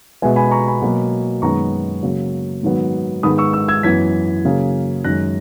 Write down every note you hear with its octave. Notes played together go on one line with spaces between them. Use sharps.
B2 G#3 B3 E5 G#5
G#5 B5
A#5 C#6
G#5 B5
B2 F#3 A#3
F#2 D#3 G#3 B3 A#5 C#6
C#3 F#3 A#3
G#2 D#3 F#3 B3
G#2 D#3 G#3 B3 B5 D#6
C#6 E6
C#6 E6
E6 G#6
F#2 E3 B3 G#6 B6
C#3 F#3 A#3
F#2 D#3 G#3 F#6 A#6